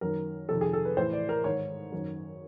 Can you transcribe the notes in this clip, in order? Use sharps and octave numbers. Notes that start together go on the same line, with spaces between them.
F#2 D#3 A#4
F2 C3 D#3 A4
G#4
A4
B4
A2 E3 C5
D5
A#4
G#2 D#3 C#5
F#2 D#3